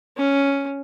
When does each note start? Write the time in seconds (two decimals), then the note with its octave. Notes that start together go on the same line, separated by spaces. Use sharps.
0.17 C#4